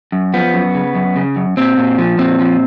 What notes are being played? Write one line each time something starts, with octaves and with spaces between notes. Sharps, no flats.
F#2
F3 B3
F#2
C#3
F#2
C#3
F#2
A#2 C4
A#2
F3
A#2 C4
F3